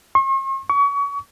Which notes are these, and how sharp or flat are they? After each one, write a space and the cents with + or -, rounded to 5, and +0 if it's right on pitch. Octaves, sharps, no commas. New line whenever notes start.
C#6 -45
C#6 +35